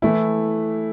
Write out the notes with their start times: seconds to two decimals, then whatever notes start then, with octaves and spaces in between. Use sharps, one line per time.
0.02 E3 A3 E4